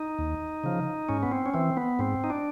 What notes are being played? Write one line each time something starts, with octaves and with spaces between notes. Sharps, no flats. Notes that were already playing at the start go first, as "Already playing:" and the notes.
Already playing: D#4
D#2
C#3 F3
G#2 C#4
B3
C4
C#4
E3 C4
B3
G#2 C4
D#4
D4